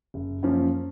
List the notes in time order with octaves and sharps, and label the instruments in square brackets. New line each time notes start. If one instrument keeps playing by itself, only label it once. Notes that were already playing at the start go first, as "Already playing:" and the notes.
[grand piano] F#1
F#2 F3 A#3 C#4